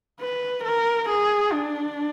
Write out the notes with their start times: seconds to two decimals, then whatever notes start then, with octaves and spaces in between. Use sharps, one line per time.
0.21 B4
0.64 A#4
1.09 G#4
1.52 D4